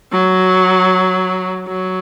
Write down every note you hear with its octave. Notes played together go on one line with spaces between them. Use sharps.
F#3
F#3